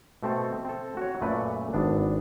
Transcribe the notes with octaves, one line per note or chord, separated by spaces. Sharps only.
B2 A3 C4 A4
C4 A4
F#4 C#5
F#2 A#2 A3 B4 D5
G#1 B3 D4